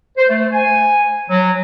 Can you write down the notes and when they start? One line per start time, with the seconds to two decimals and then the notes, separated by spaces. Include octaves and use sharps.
0.17 C5
0.29 A3
0.53 G#5
1.29 F#3